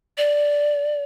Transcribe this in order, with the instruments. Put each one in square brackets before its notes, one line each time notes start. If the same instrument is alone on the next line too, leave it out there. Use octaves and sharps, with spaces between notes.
[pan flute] D5